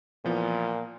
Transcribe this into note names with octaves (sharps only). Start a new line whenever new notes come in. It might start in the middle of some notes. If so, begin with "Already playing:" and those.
A#2 E3 F3 B3